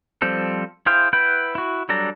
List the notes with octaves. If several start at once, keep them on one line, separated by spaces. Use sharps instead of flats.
F3 G3 C4 A4
E4 G#4 C5 F5 G5
E4 B4 F#5 G5
E4 F#4
F#3 G3 D4 A4 A#5